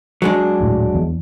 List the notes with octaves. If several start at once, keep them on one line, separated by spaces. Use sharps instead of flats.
F#3 G#3 D4
D#1 A2
E2